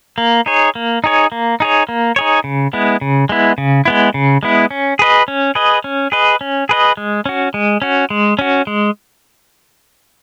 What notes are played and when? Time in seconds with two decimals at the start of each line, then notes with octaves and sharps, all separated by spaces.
0.18 A#3
0.46 D#4 G#4 C#5
0.75 A#3
1.04 D#4 G#4 C#5
1.32 A#3
1.60 D#4 G#4 C#5
1.89 A#3
2.16 D#4 G#4 C#5
2.44 C#3
2.73 G#3 B3 E4
3.01 C#3
3.29 G#3 B3 E4
3.58 C#3
3.85 G#3 B3 E4
4.14 C#3
4.43 G#3 B3 E4
4.71 C#4
4.99 G#4 B4 D#5
5.28 C#4
5.55 G#4 B4 D#5
5.84 C#4
6.12 G#4 B4 D#5
6.41 C#4
6.69 G#4 B4 D#5
6.97 G#3
7.26 C#4 F#4
7.54 G#3
7.82 C#4 F#4
8.10 G#3
8.39 C#4 F#4
8.67 G#3